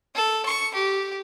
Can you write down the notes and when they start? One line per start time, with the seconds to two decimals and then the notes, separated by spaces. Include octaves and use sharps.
0.15 A4
0.45 C#6
0.74 G4